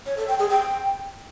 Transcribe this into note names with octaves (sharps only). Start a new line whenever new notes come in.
C#5
A4
G5
G#4
G5